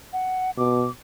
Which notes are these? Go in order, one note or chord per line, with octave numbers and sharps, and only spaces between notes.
F#5
B2 D6